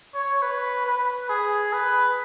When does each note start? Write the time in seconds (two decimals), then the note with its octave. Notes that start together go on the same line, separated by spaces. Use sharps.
0.15 C#5
0.42 B4
0.87 B4
1.29 G#4
1.73 B4